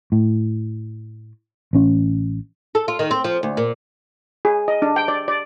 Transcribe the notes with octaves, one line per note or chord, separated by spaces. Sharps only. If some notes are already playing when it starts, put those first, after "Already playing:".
A2
A1 C#4
A4
F4
D#3
C4
F3
D2
A#2
G#4
D#5
D4
G5
D5
D5